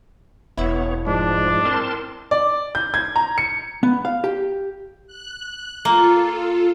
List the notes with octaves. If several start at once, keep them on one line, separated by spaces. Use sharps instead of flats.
E1 B3 E4 C#5
G#2 F3 G#3 D4
C4 A#4 A5 C6
D5
G6
G#6
A#5
C#7
B3
F5
G4
F#6
A#3 F4 A4